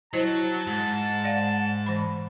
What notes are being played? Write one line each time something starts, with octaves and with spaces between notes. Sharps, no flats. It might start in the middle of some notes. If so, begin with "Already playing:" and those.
F#3 E4 C5 D#5 A5
G#2
D5 F5 F#5
E3 B5